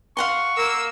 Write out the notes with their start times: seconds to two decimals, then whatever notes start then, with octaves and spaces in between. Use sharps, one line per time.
0.17 F5 F#5 C6 C#6
0.57 A#3 E6